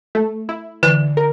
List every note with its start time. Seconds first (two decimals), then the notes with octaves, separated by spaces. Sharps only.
0.15 A3
0.49 E4
0.83 D3 E3
1.17 A#4